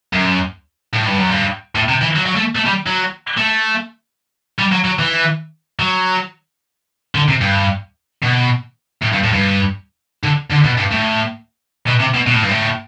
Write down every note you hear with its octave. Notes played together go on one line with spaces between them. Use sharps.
F#2
A2
G2
F#2
G2
A2
C3
E3
F#3
F#3
A3
A3
G3
F#3
A3
G3
F#3
F#3
E3
F#3
D3
C3
G2
B2
A2
G2
A2
G2
D3
D3
B2
G2
A2
B2
C3
B2
B2
A2
G2
A2